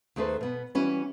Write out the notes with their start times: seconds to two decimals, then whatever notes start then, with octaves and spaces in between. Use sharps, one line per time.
0.16 D#2 A3 G#4 A4 B4 C5
0.41 B2 B3
0.75 E3 G3 C#4 F#4 B4